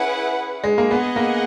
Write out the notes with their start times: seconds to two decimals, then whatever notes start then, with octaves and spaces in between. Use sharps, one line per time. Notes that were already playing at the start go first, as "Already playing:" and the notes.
Already playing: C#4 E4 G#4 B4 F#5
0.64 G#3
0.78 A#3
0.91 B3 G#4 D#5 F#5
1.16 A#3